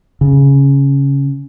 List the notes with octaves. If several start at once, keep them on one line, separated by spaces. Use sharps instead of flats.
C#3